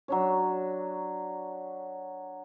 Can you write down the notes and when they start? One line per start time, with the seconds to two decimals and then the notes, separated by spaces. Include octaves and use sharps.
0.08 F#3 D4 C#5